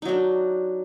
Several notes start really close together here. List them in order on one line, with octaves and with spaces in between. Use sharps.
D#4 F#3 D4